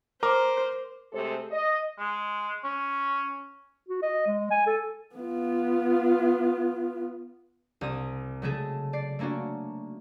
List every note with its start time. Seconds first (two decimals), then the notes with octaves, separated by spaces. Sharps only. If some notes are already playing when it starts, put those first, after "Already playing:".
0.23 A#4 C5 D6
1.13 C3 G#3 A3 A4 C5
1.51 D#5
1.99 G#3
2.64 C#4
3.89 F#4
4.02 D#5
4.27 G#3
4.51 G#5
4.67 A4
5.15 B3 F4
7.81 C2 D#6
8.42 C#3 F#3 G#3 A3 G#4 A4
8.93 D5 C7
9.19 A3 A#3 C#4 D4 F#4